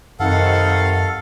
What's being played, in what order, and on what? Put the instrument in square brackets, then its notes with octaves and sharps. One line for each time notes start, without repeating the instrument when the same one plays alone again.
[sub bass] F#2 [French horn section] C3 D#3 [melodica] A4 F5 [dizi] F#5